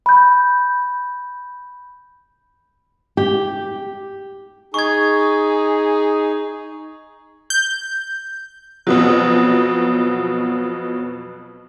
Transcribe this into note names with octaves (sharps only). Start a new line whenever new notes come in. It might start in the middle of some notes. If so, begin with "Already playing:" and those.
B5 G6
G4
D#4 G#4 C#6 G#6
G6
F2 B2 F#3